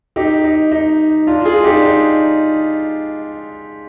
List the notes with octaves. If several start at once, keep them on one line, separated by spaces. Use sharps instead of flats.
D#4 G4
D#4
D#4
D4 F4
F4 G#4
D#4 G4
D4
D#4